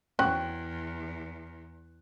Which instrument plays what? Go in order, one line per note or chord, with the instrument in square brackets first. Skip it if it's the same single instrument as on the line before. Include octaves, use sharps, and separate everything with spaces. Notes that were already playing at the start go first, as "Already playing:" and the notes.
[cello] E2 [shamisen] C#4 F#4 C5 [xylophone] G5 [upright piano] F#6